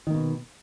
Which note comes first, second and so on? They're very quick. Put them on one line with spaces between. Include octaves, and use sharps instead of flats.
D#3 A#3 B2